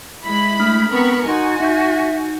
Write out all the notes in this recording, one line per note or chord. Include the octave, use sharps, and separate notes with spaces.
G#3 E4 B5
A3 D4 D#6 F6
B3 C4 A#4 B5 C#6
D#4 F#4 D#5 G#5 C6
D#4 E5 G6